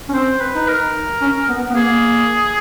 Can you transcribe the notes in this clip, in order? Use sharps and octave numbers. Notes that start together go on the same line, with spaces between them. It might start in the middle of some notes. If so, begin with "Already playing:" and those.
C#4
C4 C5
B4
D#4
A#4
C#4
B3
B3
A#3 G#4